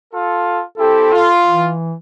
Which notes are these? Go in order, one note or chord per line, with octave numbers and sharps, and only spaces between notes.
F4 A4
C4 E4 G4 A4
F4
E3